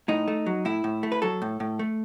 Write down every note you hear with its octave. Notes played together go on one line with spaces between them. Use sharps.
A2 D#4
A3
F#3
A2 E4
A2
A3
B4
F#3 A4
A2
A2
A3